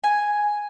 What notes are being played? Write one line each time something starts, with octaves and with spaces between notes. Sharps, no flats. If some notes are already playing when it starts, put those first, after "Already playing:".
G#5